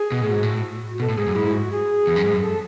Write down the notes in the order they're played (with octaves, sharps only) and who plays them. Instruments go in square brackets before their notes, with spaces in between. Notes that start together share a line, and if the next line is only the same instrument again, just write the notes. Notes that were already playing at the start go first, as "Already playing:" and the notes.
Already playing: [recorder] G#4
[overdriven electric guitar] B2
A2
[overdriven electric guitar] G#2 [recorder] F#4
[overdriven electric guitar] A2
[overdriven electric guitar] B2 [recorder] A4
[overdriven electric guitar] A2
[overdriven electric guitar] G#2 [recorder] G#4
[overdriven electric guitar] F#2
[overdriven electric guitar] G#2 [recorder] E4
[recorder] F#4
G#4
[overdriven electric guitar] E2
F#2
G#2
F#2
[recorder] A4